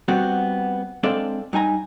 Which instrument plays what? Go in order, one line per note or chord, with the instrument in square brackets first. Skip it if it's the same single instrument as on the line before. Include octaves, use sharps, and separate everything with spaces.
[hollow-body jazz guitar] G3 B3 C4 F#4
G#3 C4 D4 A4 D5 F5
G2 D#4 G#5 A#5